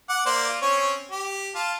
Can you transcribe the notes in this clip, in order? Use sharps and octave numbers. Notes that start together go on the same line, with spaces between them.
F#5 D6
A#3 C5 D5
F4
C4 C#4 C#5
G4
F4 A5